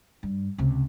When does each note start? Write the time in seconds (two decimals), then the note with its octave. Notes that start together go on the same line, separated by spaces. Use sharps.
0.23 G2
0.58 C#2 C3